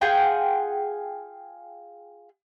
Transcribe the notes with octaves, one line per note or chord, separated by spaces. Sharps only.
F4 G#4 F#5 G5